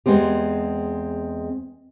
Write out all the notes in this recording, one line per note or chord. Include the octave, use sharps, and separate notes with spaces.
E2 F#3 G#3 B3 C4 G4